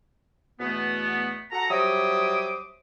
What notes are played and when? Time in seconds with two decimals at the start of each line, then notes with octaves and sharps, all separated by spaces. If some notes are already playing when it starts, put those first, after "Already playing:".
0.60 E2 B2 A3 B3
1.52 F#4 A4 F#5 A#5
1.70 F#3 G3 C5 E5 D6 D#6